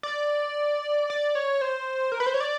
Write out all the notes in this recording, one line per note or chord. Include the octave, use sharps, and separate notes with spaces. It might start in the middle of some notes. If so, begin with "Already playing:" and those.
D5
D5
C#5
C5
A#4
B4
C5
C#5
D5